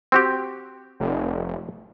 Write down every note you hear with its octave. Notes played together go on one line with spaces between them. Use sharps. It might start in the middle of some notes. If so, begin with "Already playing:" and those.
C4 F#4 G4
F1